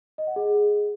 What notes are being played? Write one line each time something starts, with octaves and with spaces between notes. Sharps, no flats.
D#5
F#5
G#4